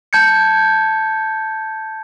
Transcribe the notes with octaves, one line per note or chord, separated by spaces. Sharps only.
A5 G6 G#6 C#7